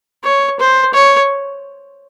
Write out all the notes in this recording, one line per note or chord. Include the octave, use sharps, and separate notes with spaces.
C#5
C5
C#5